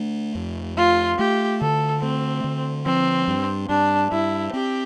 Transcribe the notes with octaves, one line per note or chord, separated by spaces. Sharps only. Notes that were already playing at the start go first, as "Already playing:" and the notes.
Already playing: A3 D4
F2
A3 F4
A3 G4
D3 A4
A3 C4
D3
F3 C4
G2
G2 D4
G2 E4
C4 G4